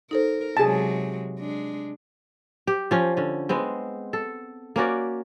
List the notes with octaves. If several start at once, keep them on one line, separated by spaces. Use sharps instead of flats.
D#4 A4 A#4 C5
C3 F#3 G#3 G#4 A5
G#3 D4
G4
F3 C#4
D3 C#4
G#3 B3 C4
A4
A#3 C#4 F#4 D5